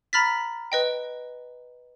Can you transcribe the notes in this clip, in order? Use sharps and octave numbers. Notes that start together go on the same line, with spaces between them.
A#5 B5 F6 A6 B6
B4 D#5 G5